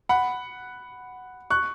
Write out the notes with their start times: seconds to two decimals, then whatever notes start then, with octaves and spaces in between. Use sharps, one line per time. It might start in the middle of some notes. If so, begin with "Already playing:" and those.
0.09 F#5 B5
1.50 C#6 F#6